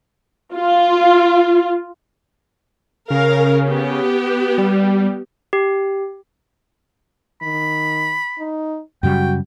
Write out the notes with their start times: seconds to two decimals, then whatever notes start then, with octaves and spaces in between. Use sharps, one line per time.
0.55 F4
3.11 C#3 A#4 F5
3.68 B3 G4
4.58 G3
5.53 G4
7.42 D#3 B5
8.39 D#4
9.03 F#2 C#3 G3 F#4 G5